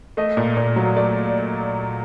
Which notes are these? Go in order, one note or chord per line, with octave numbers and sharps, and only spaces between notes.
A3 D#5
A#2
A#2
F#3
A3 D5